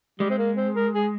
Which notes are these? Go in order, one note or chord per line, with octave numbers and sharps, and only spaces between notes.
G3 G#3
C4
A#3
C4
A#4
G#4